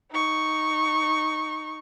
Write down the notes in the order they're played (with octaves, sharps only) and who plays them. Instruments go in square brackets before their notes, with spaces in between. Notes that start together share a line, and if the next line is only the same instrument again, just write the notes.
[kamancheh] D#4 C#6